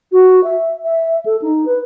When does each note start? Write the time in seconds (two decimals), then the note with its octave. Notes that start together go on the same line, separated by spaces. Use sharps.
0.12 F#4
0.44 E5
0.85 E5
1.26 A4
1.42 D#4
1.66 B4